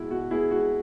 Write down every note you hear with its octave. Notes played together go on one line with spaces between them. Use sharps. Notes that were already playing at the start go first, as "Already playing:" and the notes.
Already playing: B2 G#3 E4 F#4
B2 F#4
B3 E4 G#4
G#3 F#4